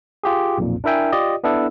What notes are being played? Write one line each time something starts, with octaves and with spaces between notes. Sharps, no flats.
F4 G4 G#4
B1 F2 A#2
D4 E4 A#4 E5 G5 G#5
F4 G4 D5 D#5
B3 D4 E4 A4